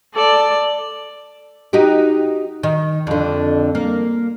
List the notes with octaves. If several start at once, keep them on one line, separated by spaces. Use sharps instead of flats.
A4 D5
D#4 F#4 G4
D#3
F2 D3
A#3